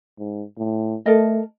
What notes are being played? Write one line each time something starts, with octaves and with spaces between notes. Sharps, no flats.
G#2
A2
A3 A4 A#4 D#5